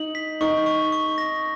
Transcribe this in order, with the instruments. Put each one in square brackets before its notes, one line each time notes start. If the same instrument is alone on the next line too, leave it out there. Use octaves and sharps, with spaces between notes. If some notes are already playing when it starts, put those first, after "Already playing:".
Already playing: [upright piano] D#4 [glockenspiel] F#7
[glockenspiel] B6
[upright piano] D#4 [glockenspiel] C#6
[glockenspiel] C#6
C#6
A#6